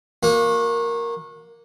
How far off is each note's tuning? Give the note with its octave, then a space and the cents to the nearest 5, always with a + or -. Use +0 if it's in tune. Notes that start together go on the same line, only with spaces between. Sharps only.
A#3 +0 F#4 -30